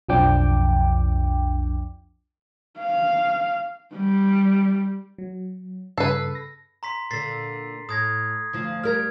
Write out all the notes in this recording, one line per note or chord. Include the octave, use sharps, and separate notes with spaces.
B1 F2 F3 D4 G5 D6
F5
G3
F#3
G2 C#3 A4 B4 C7
A#6
A#5 C6 B6
A#2 D3 A6 B6 C7
A2 D#6 G#6 A#6
D2 F3 F4
G3 A#4 F6 G#6